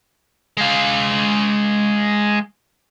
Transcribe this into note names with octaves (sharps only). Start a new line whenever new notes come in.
G#3 F5